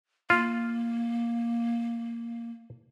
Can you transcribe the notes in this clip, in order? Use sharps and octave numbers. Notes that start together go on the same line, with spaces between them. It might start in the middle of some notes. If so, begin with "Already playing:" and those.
A#3 F4